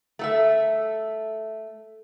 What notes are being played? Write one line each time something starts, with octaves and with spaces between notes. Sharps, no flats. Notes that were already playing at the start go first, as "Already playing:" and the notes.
A3 A4 E5